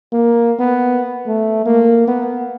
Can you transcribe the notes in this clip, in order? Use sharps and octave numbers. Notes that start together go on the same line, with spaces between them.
A#3
B3
A3
A#3
B3